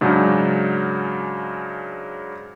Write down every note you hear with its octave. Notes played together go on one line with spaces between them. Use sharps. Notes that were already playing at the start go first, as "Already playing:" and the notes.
G#2 C#3 F#3 C#4 D4